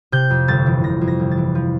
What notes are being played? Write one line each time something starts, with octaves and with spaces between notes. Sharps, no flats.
C3 G6
F2
G1 A6
E3
C3 A#6
F2
A#6
G1
A6
E3
F3